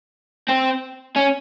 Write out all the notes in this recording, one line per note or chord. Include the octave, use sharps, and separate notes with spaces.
C4
C#4